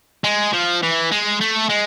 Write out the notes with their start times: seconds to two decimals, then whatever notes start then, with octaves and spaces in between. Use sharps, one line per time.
0.24 G#3
0.53 F3
0.82 E3
1.11 G#3
1.41 A3
1.69 G#3